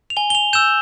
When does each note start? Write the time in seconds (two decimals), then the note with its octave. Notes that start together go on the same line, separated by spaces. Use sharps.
0.10 F7
0.17 G#5 G7
0.30 G7
0.35 F7
0.53 E6 G6 E7